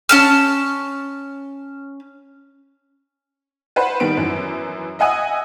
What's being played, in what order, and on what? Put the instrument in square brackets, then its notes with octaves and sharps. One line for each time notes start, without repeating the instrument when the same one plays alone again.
[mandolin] C#4 A5 F6
[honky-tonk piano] B4 C5 F#5 B5
D#3 G3 B3 D7
F#2 E3
D#5 E5 F#5 G#5 D#6